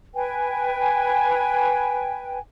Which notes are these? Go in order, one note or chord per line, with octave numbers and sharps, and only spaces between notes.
B4 G5 G#5